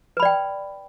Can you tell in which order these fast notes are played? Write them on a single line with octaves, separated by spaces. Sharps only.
B4 B5 D5 G5